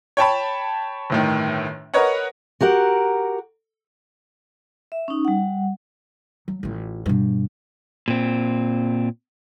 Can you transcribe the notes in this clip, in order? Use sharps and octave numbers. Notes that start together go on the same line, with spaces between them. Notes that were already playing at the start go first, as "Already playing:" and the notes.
C#5 G5 A5 B5
G1 A2 D#3
A#4 B4 C#5 D#5 F#5
F#4 G4 A#4 F#5
E5
C#4 D#4
G3 F#5
F#3
A1 F4
G2 B2
A#2 C4